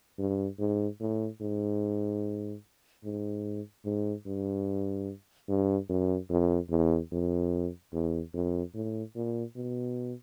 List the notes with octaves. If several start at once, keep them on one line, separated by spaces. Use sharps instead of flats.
G2
G#2
A2
G#2
G#2
G#2
G2
G2
F#2
F2
E2
F2
E2
F2
A2
A#2
B2